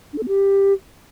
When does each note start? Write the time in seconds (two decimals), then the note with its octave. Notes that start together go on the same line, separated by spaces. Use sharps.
0.13 D4
0.18 A4
0.23 B3
0.28 G4